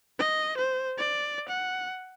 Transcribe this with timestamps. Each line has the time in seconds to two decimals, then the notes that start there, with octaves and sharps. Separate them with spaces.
0.19 D#5
0.58 C5
0.98 D5
1.49 F#5